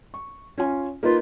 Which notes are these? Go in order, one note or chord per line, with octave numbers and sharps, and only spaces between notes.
C#6
C#4 F4 G#5
A#3 D#4 F4 B4